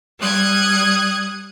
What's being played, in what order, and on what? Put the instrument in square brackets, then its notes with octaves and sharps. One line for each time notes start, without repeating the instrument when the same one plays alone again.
[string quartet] G3 D#6 F#6 G#6